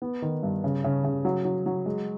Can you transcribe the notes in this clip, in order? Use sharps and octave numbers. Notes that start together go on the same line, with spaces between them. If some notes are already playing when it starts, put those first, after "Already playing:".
B3
D#3
G2
C#3
C#3
C#3
F#3
F#3
F#3
G#3